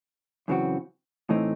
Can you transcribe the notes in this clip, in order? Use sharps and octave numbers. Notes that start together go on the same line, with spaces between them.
F#2 C#3 E3 C4 F#4
A2 E3 A3 C4 D#4